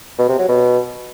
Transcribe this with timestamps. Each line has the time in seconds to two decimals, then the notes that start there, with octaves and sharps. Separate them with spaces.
0.19 B2
0.29 C3
0.39 F#3
0.49 B2